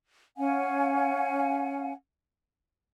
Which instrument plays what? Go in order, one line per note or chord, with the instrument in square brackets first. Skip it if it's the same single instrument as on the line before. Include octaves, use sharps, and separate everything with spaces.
[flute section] C#4 F5 F#5 G#5